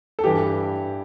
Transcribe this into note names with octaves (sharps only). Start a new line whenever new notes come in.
A4
G2 E3 G3 G4